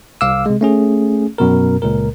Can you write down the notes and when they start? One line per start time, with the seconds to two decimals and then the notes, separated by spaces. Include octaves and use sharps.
0.21 C2 F5 D6 E6
0.46 C3 G#3
0.61 A3 C#4 G#4
1.38 F#2 B2 A#4
1.82 C#2 A#2 A#4